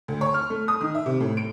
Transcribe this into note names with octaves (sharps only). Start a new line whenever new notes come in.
D2
C#5
F6
A3
D#6
D#3
E5
C3
A2
D7